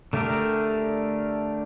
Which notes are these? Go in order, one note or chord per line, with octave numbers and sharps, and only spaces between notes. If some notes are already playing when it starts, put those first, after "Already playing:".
D3 A3 D4 G4 A#4